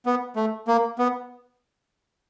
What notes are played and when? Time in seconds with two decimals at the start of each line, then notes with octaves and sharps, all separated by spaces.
0.06 B3
0.36 A3
0.68 A#3
0.99 B3